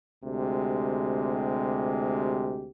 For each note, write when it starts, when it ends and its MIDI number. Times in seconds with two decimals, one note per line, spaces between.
0.25 2.70 38
0.25 2.70 48
0.25 2.70 56
0.25 2.70 67